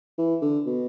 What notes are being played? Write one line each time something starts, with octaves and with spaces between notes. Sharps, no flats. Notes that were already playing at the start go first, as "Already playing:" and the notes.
E3
D3
B2